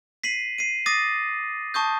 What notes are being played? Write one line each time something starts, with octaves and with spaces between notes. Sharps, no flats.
B6 C7 D#7 F#7
C7 D#7
D6 D#6 A6 A#6 C7 D#7
A5 C#6 D#6 G6